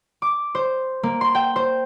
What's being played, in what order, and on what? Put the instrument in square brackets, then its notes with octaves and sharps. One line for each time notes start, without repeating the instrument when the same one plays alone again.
[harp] D6
C5
A#3
C6
G5
C5